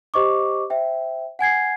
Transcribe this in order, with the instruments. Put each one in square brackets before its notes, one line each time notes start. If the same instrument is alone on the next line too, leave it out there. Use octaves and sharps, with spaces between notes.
[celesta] G4 C5 D#5 C#6 D6
C5 E5 G5
F#5 G#5 G#6 C7